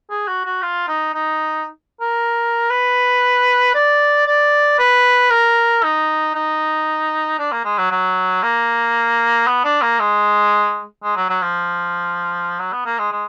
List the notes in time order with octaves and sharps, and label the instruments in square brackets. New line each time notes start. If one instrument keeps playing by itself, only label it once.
[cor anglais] G#4
F#4
F#4
F4
D#4
D#4
A#4
B4
D5
D5
B4
A#4
D#4
D#4
D4
A#3
G#3
F#3
F#3
A#3
B3
D4
A#3
G#3
G#3
F#3
F#3
F3
F#3
B3
A#3
G#3
G#3